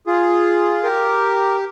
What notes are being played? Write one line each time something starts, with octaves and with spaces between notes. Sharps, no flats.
F4 G#4
G4 A#4